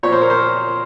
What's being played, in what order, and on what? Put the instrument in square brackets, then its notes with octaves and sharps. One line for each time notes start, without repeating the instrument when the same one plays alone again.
[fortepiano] A#2 F3 C4 C#5
C5
A#4
C5